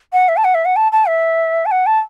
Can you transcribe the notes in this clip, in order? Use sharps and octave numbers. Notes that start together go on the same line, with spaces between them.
F#5
E5
A5
F#5
E5
F#5
A5
A5
E5
A5
F#5
A5